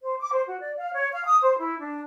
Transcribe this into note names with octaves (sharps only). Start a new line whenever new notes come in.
C5
D6
C5
F#4
D5
F5
C#5
F5
D#6
C5
E4
D4